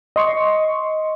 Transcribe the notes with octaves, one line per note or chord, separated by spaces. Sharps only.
D#5 C6 C#6